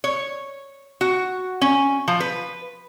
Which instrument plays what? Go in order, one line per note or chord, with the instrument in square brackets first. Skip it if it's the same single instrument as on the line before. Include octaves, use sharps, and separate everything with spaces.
[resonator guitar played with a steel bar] C#5
F#4
C#4
F3
B4